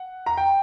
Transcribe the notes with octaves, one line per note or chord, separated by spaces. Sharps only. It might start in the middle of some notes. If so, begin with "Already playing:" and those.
Already playing: F#5
A#5
G5